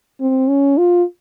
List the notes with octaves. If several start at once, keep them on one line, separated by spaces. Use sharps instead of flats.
C4
C#4
F4